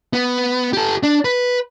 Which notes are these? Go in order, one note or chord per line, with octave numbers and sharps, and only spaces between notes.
B3
G4 A4
D4
B4